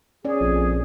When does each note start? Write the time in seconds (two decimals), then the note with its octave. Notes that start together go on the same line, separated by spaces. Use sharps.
0.25 C#4 G#4 C#5 D5
0.41 A#1 F2